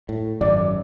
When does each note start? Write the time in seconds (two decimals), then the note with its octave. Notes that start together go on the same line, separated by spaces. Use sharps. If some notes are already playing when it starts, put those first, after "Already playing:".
0.09 A2
0.41 G#1 F#2 D5